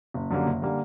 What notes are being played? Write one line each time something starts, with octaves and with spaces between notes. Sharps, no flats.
F#1
F#2 D3 G3 A#3
F#1
D3 G3 A#3